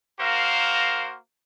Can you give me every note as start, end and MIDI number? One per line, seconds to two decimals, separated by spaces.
0.20 1.17 58
0.20 1.17 66
0.20 1.17 70
0.20 1.17 72
0.20 1.17 77